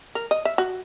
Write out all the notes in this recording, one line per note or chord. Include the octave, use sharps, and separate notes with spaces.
A#4
D#5
E5
F#4